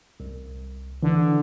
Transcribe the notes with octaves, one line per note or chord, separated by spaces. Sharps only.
C2
D3 E3